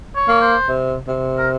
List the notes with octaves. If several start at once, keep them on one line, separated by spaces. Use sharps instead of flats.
C#5
A#3
C5
C3
C3
A#4